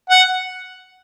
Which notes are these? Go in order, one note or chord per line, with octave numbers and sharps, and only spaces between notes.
F#5